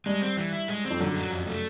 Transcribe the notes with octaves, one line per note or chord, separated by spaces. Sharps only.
G2 G#3
C4
E3
E4
G#3
C4
F2
F#2 D3
F#3
F2
A3